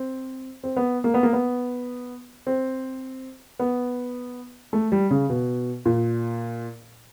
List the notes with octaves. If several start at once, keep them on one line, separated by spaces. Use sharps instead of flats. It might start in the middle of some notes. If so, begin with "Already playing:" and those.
Already playing: C4
C4
B3
A#3
B3
A#3
B3
C4
B3
A3
G3
C#3
B2
A#2